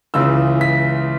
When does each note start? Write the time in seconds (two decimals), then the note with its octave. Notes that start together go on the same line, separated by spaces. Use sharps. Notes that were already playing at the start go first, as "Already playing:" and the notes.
0.14 C#2 C#3 E3 E6
0.61 B6